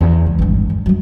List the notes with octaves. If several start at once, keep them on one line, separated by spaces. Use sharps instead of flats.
E2
C#2
G#1 G2
E2
F#2 G3